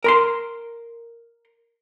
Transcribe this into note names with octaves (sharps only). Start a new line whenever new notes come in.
A#4 B5 C6